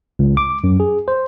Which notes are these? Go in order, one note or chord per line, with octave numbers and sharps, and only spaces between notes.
C#2
D6
F#2
G#4
C5